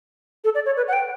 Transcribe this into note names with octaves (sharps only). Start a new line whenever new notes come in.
A4
D5
C#5
B4
F#5
G5